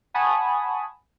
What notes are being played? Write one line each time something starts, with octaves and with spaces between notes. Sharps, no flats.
F#5 G#5 A5 B5 C#6 D#6